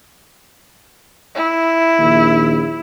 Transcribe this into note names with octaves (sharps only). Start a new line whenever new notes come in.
E4
A#1 D#2